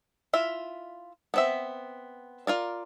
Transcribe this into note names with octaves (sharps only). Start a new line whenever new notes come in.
E4 F4 E5
B3 C4 E5
F4 A#4 D5